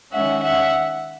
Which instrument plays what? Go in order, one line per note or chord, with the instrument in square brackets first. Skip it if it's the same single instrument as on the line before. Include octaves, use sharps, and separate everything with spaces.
[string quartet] D#3 G#3 C#4 E5 F#5
E5 F#5